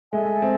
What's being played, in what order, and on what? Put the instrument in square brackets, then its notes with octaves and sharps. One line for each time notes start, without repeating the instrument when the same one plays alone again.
[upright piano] G#3 [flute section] A4 E5 G#5
[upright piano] C4